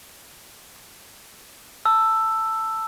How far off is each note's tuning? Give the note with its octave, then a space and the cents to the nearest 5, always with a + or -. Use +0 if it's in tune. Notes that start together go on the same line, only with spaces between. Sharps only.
A5 +10 E6 +5